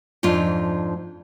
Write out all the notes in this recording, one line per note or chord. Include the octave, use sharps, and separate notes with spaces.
F2 G#2 D4 F4